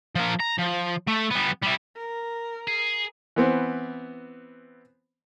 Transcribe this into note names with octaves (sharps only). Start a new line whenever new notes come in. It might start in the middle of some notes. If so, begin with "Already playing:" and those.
F3 A#4
A#5
F3
A3
G3 B3
G3 E4
A#4
G#4 C7
E3 B3 C4